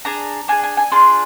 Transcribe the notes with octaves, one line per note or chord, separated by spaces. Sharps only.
D4 G#4 A#5
D4 G#4 G#5
G#5
G#5
D4 F4 G#4 C6